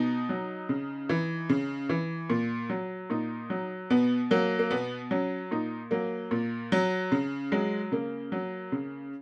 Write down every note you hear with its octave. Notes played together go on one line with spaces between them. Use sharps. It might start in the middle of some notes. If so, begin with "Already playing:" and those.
Already playing: B2 D#4
F#3
C#3
E3
C#3
E3
A#2
F#3
A#2 D#4
F#3
B2 B3
F#3 A#3
A#3
B2 B3
F#3 C#4
A#2 D#4
F#3 A#3
A#2
F#3
C#3
F#3 G#3
C#3 A#3
F#3
C#3